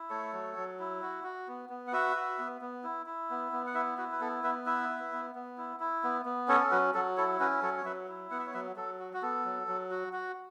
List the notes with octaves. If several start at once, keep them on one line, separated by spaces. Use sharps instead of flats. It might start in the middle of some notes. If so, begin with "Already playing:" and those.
Already playing: E4
A3 A4 C#5
F#3
F#3
E4
F#4
F#4
B3
B3
F#5
F#4 B4 E5
F#4
B3
B3
E4
E4
B3
B3
F#5
E4 B4 E5
E4 F#4 B4
B4
B3 A4
B3 B4 E5
E4 B4 E5
E4
B3
B3
E4
E4
B3
B3
C#4 A4 C#5
A4
F#3 F#4 B4
F#3 A4
E4 A4 C#5
C#4 F#4 B4
F#3 A4 C#5
C#5
F#3 B4 E5
E4
B3 F#5
E5
C#5
F#3 B4 E5
F#3 A4
F#4
F#4
B3 A4
F#3
F#3
F#4
F#4